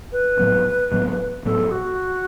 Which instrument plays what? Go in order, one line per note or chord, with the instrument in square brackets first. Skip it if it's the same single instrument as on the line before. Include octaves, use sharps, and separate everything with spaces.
[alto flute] B4
[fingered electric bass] A2 F#3 B3
A2 F#3 B3
[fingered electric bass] A2 F#3 B3 [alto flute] A4
[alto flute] F#4